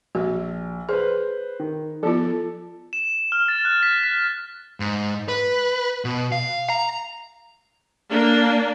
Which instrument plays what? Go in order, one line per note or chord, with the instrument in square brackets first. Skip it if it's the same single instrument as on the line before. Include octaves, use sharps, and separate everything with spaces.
[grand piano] A#1 [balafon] F#4
[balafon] G#4 [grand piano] B4 C5
[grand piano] D#3
[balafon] F3 B3 F4 [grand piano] A4
[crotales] E7
F6
A6
F#6
B6
B6
[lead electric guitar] G#2
B4
B2
F5
A#5
[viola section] A#3 D4